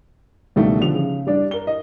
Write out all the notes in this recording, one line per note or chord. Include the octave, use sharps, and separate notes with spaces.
C#2 B2 D#3 G3 A3
D3 F3 F7
C#3
G3 D4 D5
A#4 G7
D#5